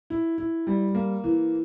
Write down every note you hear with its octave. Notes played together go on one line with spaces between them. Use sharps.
E4
E4
G3
A#3
E3